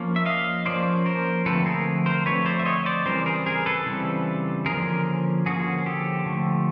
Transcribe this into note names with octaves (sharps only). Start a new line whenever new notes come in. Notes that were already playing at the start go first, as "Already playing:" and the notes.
Already playing: F3 A#3 C#4
E5
D#5 F5
F3 A#3 C#4 C5 D5
A#4 C5
D3 F3 A3 C4 A4 B4
G#4 A#4
A#4 C5
D3 F3 A3 C4 B4 C#5
C5 D5
E5
C#5 D#5
C5 D5
C#3 E3 G3 C4 A#4 C5
G#4 A#4
G#4 A#4
A4 B4
C#3 E3 G3 C4
D3 F3 A#3 C#4 G#4 A#4
D3 F3 A#3 C#4 F#4 G#4
G4 A4
D3 F3 A3